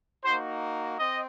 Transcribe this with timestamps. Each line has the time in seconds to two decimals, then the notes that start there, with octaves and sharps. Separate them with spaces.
0.24 A#3 D#4 F#4 C5
0.98 C4 D#5